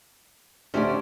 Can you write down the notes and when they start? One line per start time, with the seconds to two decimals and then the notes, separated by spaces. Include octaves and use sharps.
0.74 D2 C#4 G4 C5 D5